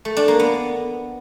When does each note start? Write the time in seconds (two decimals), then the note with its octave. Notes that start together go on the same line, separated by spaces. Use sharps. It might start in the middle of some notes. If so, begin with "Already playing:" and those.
0.05 A3
0.17 D4
0.28 A#3
0.39 B3